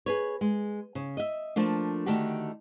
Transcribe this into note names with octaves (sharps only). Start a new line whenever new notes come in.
G#4 B4 C#5
G#3
C#3
D#5 E5
F3 A3 A#3 D4
D3 D#3 A3 D4 F#4 G4